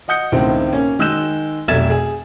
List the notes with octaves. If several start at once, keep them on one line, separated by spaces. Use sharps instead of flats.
D#5 F#5 D#6 G6 C#7
C#2 A2 D#3 C4
A#3 C#4
D#3 G#3 E6 F#6 G6 E7
F1 B1 E5 G#6 A6 E7
G#4